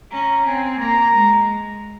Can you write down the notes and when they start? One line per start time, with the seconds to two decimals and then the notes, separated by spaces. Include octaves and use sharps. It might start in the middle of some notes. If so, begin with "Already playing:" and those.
0.12 C#4 A#5
0.46 C4 G#5
0.80 A#3 A#5
1.14 G#3